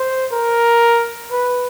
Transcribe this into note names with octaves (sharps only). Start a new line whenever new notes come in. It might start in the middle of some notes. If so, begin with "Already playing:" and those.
Already playing: C5
A#4
B4